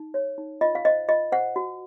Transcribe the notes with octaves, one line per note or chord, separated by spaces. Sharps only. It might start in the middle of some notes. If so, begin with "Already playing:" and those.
Already playing: D#4
C#5
D#4
F4 D#5
F5
C5 D#5
F4 D#5
C5 F#5
F#4